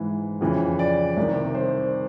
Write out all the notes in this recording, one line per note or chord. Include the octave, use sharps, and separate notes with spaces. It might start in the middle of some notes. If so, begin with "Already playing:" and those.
Already playing: G#2 E3
F2 C#3 E3
D5
C2 C3 D#3
C5